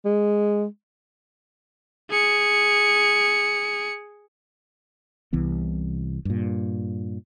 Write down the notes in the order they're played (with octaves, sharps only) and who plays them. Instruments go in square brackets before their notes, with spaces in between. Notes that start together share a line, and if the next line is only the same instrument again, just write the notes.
[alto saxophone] G#3
[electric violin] G#4 C#7
[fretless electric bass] C2 C3 E3 B3
G2 A#2